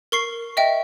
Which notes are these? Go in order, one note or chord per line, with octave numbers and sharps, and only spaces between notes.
A#4 C#6 C7
D#5 E5 G5